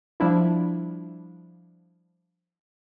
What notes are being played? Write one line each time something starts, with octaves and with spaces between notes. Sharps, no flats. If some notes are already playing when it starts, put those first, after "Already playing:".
F3 G3 D4 E4 F4